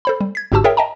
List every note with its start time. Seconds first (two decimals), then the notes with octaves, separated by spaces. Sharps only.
0.05 A4 C5 B5
0.21 G3
0.35 G#6 B6
0.52 G1 G#2 F#4 G4 A5 E6
0.64 G#4 A#4 C#5 E5 G5
0.77 D#5 E5 G5 A5 A#5